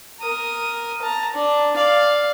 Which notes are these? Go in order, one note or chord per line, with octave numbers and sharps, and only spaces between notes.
A#4 D#6
A5 A#5
D4
D5 F5